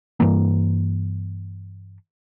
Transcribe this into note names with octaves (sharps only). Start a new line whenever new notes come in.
G2 E3 A#3